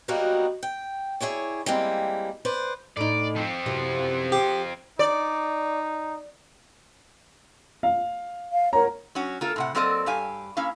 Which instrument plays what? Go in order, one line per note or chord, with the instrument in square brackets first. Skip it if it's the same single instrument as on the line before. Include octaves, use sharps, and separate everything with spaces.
[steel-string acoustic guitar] F#3 G3 A#3 B3 D#4 F#4
G5
E4 G#4 C#5 D5
G3 G#3 A#3 C4 E4
B4 C5 D5
[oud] A2 D#4 [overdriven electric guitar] D5
[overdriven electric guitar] F3 C4
[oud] F#2 C3 E3
[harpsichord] G4
[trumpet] D#4 [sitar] D5
[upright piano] F5
[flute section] F5
[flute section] A#4 C#5 F#5 [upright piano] A#5
[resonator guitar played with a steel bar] F#3 C#4 F#4
A#3 F4 A4
A2 C3 F#5
F#3 A#3 C4 A4 D5 D#5
G2 G4 F5 G#5
A#3 C#4 E4 F5